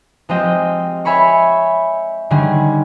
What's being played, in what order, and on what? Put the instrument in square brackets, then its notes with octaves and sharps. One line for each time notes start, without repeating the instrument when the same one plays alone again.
[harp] F3 G#3 C4 F4 G4 D#5
C#5 E5 G#5 B5 C#6
D3 D#3 G3 C#4 G#4